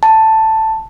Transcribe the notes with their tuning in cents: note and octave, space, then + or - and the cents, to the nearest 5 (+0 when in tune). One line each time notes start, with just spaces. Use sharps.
A5 +5